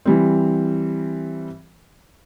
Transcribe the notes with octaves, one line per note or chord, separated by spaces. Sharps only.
E3 G3 C4